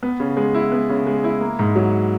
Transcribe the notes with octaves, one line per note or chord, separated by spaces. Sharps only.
B3
C#3
G#3
E4
B3
C#3
G#3
E4
A#3
G#2
F#3